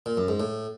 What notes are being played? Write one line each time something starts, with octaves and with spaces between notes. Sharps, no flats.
A#2
F#2
G#2
A2